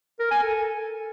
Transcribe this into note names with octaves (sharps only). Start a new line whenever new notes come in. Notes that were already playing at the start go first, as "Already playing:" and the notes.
A#4
G#5
A4